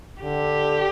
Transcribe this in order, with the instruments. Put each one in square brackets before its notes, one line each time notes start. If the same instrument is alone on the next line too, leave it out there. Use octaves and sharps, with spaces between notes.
[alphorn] D3 [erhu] G4